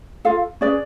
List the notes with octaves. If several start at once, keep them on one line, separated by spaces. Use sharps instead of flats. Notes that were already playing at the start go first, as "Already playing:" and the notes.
F4 A4 F5
C#4 G#4 B4 D5